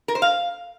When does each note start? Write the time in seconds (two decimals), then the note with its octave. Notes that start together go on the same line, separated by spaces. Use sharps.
0.08 A#4
0.15 C5
0.22 F5